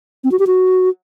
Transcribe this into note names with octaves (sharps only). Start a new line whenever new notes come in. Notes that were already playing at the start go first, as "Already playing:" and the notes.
C4
F#4
G4
F#4